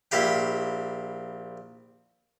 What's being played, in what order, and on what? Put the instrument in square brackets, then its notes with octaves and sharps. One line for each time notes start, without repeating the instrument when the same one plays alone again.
[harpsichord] A#1 E4 G4 F5 G5